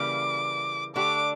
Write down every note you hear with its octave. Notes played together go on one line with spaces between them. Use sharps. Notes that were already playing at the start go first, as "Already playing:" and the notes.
Already playing: C#3 E3 G3 A#3 D6
D3 A3 D4 G4 D6